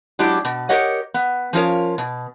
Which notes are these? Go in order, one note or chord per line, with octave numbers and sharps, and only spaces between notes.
F#3 G#3 D4 E4 G4
B2
G4 A#4 C#5 D#5 F#5
B3
F3 C#4 F4 A#4 C#5
B2